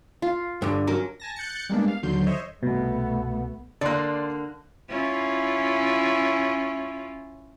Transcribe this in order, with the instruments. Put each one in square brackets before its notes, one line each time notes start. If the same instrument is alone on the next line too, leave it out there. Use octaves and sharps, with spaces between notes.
[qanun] F4
[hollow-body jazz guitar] G2 D3
[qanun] F#3 C#4 A#4
[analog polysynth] G#5 A5 A#6
F#6 G6 A6 C#7
G3 G#3 A#3 B3 D4
F5
D#2 D3 F#3 C6 G6
C5 C#5 D#5 E5
[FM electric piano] C2 B2 [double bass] A3 B3
[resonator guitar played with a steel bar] D3 A#3 [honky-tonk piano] D5 C6 F#6
[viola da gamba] C#4 E4 F4